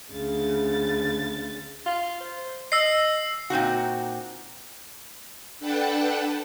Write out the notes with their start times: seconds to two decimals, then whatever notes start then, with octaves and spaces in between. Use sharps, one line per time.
0.12 D2 C#3 A6
1.86 F4
2.20 C5
2.72 D#5 E6 C7
3.50 A#2 C4 D#4 F#4
5.60 D4 A4 B4 F#5 G5 A5